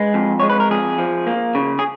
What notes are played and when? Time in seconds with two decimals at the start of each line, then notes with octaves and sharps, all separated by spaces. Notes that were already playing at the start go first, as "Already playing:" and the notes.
Already playing: G#3 B4
0.14 F2
0.40 G#3 C#5
0.50 B4
0.60 A#4
0.70 F2 G#4
0.98 F3
1.27 A#3
1.55 C#3
1.79 G#4